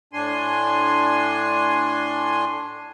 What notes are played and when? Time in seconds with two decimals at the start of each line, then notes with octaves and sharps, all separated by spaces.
0.13 A2 D4 G#5 C6